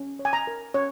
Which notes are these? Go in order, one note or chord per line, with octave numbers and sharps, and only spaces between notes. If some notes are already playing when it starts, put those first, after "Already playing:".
Already playing: C#4
C#5
G#5
A#5
A#4
C#4 C#5